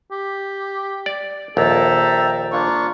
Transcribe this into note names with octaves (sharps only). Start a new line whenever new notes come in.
G4
D5
A#1 D#2 A4 E5 G5 A#5
A#3 D4 F4 C#6